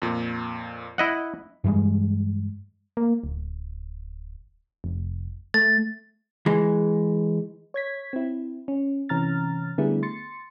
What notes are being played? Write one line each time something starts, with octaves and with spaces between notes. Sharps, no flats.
F2 A#2
E4 D#5 F#5
G2 E3 G3 G#3
A#3
D1
F1
A3 A6
E3 G#3
C#5 G#6 B6
C4 E4
C#4
C3 E3 C#4 A#5 F6 A6
D3 G3 A3 B3 E4 G#4
C6 A6 C#7